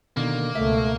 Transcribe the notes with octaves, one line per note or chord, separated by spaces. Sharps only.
B2 D3 D#3 A#3
C#2 B2 A3 E5